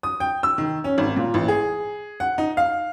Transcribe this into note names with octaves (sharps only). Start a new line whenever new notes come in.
D#6
G5
E6
D#3
C#4
G#1
A#2
A1
G#4
F#5
D#4
F5